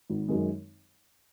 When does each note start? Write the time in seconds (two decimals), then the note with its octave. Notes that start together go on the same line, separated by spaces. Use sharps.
0.10 G#1
0.28 F#2 D#3 G#3